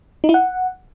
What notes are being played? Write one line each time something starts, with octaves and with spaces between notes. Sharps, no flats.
D#4
E4
F#5